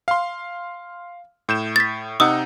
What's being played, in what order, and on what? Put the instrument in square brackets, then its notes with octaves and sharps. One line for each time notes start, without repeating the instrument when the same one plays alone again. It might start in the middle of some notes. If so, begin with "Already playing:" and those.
[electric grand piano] F5 C6
A2 G6 E7
[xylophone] A6 B6
[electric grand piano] C3 D#4 F#5 [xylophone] D#6 E6